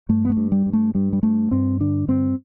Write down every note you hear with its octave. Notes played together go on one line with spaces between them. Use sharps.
G2 A3
B3
A3
G2
G3
G2
A3
G2 G3
G3
G2 A3
G2 C4
D3 D4
G2 C4